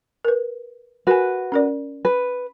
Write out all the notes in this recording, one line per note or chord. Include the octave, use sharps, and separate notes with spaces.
A#4 B4
F#4 A#4 B4 G#5
C#4 A#4 D5
B4